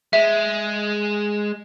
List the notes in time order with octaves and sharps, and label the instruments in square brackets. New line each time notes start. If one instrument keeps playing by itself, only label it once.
[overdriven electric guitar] G#3 [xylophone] E5